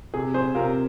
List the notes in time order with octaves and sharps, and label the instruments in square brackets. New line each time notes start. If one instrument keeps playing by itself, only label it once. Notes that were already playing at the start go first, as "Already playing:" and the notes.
[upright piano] C3 G#4
G#4 C5
C3 F4 A#4